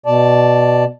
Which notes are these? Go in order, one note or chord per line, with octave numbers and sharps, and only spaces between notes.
B2 D5 A5